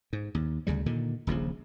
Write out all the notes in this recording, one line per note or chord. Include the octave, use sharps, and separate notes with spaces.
G#2
D#2
D2 C#3 G3
A#2 D3 D#3
D#1 A#1 C#3 F3